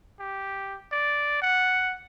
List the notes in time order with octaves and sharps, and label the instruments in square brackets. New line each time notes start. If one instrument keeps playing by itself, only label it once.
[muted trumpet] G4
D5
F#5